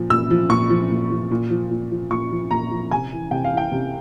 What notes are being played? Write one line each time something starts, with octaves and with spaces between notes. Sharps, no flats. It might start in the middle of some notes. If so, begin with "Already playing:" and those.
Already playing: A#2 F3
A#2 E6
F3
A#2 C#6
F3
A#2
F3
A#2
F3
A#2
F3
A#2 C#6
F3
A#2 A#5
F3
C3 G#5
E3
C3 G5
F5
E3
G5
C3